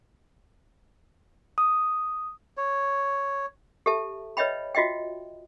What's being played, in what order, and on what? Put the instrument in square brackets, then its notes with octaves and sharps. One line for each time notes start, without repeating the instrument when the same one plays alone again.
[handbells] D#6
[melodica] C#5
[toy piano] G4 A4 E5 A5
B4 C#5 D#5 E5 G5 B5
F4 F#4 D#5 E5 G5